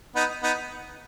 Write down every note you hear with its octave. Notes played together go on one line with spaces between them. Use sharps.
B3 D#4
B3 D#4